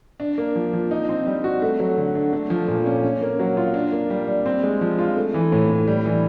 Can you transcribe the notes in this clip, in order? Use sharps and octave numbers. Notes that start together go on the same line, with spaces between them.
D4
A#3
F3
F3
D#4
C4
G3
F#4
A3
F#3
D3
D4
A3
F3
A#2
C#4
C#4
A#3
F#3
F4
D4
A#3
G3
G3
C4
G#3
F3
F4
A3
E3
A2
A2
G3
E3